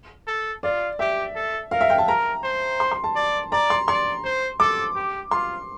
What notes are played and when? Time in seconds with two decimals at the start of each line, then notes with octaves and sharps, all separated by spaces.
0.27 A4
0.63 F4 D5
0.99 G4 E5
1.35 A4
1.71 A#4 F5
1.81 E5
1.90 G5
1.98 A5
2.08 A#4 A#5
2.43 C5
2.80 C6
2.92 C6
3.04 A5
3.15 D5
3.52 D5 A#5
3.70 C6
3.88 D5 C6
4.24 C5
4.60 A4 D6
4.96 G4
5.31 F4 C6